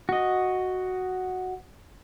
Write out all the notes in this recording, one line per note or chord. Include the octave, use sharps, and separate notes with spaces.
F#4 D#5